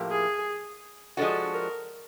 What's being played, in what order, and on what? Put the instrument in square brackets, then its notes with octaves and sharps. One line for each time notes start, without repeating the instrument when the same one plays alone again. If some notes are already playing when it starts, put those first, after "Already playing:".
Already playing: [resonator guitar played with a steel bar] A2 F3 A#3 G4
[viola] G#4
[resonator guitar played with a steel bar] F3 G#3 B3 D4 F#4 [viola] A4
[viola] A#4